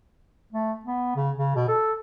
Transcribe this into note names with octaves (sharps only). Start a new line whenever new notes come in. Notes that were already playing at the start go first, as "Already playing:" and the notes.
A3
B3
C#3
C#3
B2
A4